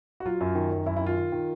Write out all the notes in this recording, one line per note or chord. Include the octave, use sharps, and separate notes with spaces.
F#4
F#3 F4
F#2
D#3
F#2
F#2 E4
E4
D#3
F4
D#3
D#3